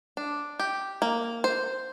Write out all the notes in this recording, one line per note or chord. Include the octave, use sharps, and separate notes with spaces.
D4
G4
A#3
C5